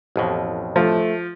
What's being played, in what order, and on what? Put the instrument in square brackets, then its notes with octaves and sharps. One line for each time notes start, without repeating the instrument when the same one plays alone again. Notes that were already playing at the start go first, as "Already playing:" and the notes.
[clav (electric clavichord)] A1 F2 B2
[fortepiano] F3 [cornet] A3